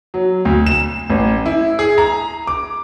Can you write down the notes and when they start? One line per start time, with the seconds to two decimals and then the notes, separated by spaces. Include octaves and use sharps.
0.14 F#3
0.45 D2
0.66 E7
1.10 A1
1.46 E4
1.79 G#4
1.98 A#5
2.47 D6